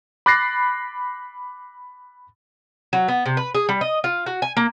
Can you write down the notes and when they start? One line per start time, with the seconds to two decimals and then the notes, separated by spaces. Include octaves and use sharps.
0.26 B5 D6 F#6 A6 A#6 C7
2.93 F#3
3.08 B3
3.26 C3
3.37 B4
3.55 G#4
3.69 G3
3.81 D#5
4.04 F4
4.26 F#4
4.42 G#5
4.57 A#3